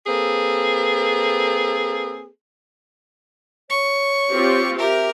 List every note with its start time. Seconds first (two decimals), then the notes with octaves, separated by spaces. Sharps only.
0.06 A#3 C4 G#4 A4 B4
3.70 C#5 C#6
4.31 C4 F4 G4
4.78 G4 A#4 E5